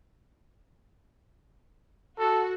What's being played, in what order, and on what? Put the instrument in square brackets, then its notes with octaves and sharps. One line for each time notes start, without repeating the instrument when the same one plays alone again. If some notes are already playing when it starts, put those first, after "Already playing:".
[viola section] F#4 [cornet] A4